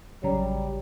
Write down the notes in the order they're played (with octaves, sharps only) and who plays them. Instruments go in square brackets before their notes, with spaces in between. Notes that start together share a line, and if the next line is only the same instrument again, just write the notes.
[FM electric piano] A1 C#3 F#3 [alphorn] G3 [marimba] C#5 A#5